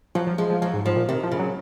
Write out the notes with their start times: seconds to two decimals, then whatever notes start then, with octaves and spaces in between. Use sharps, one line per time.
0.15 F3 F#3
0.27 F3
0.38 F3 G#3
0.50 F3
0.62 F3 F#3
0.73 G#2
0.85 G#2 F3
0.96 A#2
1.08 C3 D#3
1.23 F3
1.31 C#3
1.39 F#3